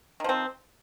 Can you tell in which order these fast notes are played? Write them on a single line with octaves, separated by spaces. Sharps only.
D#3 F3 C4